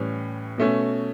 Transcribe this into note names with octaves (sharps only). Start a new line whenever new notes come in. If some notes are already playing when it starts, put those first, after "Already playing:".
Already playing: A2 E3 G3 C#4
B2 A3 C#4